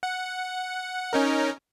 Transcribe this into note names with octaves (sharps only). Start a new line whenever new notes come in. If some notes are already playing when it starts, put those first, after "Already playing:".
F#5
C#4 D#4 A#4